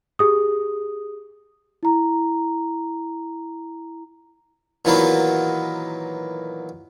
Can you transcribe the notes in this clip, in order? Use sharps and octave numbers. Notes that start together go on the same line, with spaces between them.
G4 G#4 D#6
E4 A#5
A#2 D#3 E3 F#3 A#3 B3